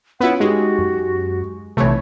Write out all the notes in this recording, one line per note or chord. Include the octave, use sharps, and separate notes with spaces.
B3 C#4 E4 F4 F#5
G#3 D#4 F#4 G4
F#2
B1 C3 E3 A3 C#5